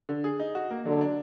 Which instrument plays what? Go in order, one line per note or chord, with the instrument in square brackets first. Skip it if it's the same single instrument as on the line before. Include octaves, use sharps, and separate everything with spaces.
[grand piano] D3
G#4
D#4
F#4
A#3
[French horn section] D3 [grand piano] F#3
[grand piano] D4